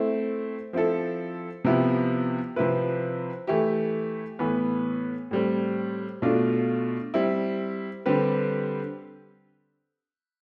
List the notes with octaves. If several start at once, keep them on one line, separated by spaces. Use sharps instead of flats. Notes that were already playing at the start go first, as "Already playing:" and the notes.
Already playing: A3 C4 E4
F3 C4 E4 A4
C3 F3 B3 E4 G4
C3 F3 C4 E4 B4
E3 A3 E4 G4
A2 E3 B3
A2 G3 C4
B2 A3 D4 F4
G3 C4 E4
D3 G3 C4 G4 B4